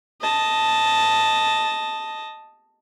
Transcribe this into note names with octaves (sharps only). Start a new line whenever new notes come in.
D#5 A5